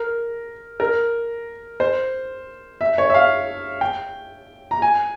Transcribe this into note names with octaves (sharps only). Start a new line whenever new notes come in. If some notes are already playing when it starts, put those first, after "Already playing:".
Already playing: A#4
A#4
C5
E5
C#5
E5
F5
G5
A#5
G#5